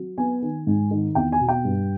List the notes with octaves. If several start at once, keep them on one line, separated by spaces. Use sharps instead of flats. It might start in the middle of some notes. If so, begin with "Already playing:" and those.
Already playing: F#3
B3 G#5
D#3
G#2
D#3
E2 G5
G#5
B2
G5
G2